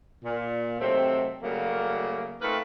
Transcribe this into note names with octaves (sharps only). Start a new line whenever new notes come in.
A#2
C3 D#3 F#3 A3 C4
C#3 F#3 G3 A3 A#3
A3 C4 D#4 F4 A#4 B4